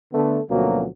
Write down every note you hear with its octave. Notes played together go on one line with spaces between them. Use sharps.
D3 A3 B3
D2 B2 F3 F#3 A#3 C#4